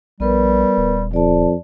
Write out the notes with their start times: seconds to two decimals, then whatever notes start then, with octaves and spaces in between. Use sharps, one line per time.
0.20 A#1 G3 B3 A#4 B4
0.77 D#1
1.13 F2 D5 A5